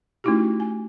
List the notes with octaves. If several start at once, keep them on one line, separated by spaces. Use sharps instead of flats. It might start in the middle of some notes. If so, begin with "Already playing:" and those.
A3 C#4 D#4 E4 F#4 G4
G#5